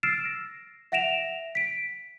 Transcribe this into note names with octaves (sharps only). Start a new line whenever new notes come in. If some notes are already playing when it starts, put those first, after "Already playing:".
E6 F6 A6 C7 D7 E7
A#6
E5 F#5 A#6 D7 E7 F7
B6 D7